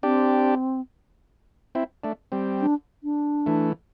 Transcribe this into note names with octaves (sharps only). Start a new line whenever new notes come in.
C4 D4 G4
C4 E4
A3 D4
G3 C4
D4
D4
E3 A3